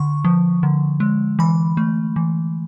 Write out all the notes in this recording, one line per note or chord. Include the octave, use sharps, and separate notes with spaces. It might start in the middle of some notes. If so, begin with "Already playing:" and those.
Already playing: D3 C#6
F3
D3
G#3
E3 B5
A3
E3